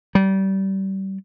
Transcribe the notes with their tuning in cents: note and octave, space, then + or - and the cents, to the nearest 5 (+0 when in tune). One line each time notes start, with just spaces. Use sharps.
G3 -25